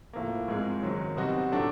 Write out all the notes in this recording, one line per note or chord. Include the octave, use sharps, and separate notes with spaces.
A2 F3 A#3
G#2 F3 G#3 C4
F#2 D#3 F#3
B2 G3 C4 D#4 F#4
A2 F#3 A3 D4 F#4